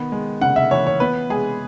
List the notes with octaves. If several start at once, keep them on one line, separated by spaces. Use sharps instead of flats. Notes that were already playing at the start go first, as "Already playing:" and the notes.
Already playing: D#3 B3
G#3
C#3 F#5
E5
E3 C#5
C#5
B3 B4
G#3 G#4